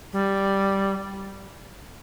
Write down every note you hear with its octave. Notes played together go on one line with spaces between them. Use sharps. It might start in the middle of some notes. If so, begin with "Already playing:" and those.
G3